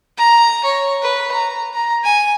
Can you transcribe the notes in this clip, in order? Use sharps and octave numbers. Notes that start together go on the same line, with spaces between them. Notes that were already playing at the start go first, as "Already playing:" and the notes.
A#5
C#5
B4
A#5
A#5
G#5